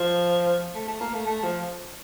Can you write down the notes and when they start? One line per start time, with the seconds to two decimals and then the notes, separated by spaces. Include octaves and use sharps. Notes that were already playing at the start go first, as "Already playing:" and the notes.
Already playing: F3
0.75 A3
0.88 A3
1.00 A#3
1.14 A3
1.27 A3
1.44 F3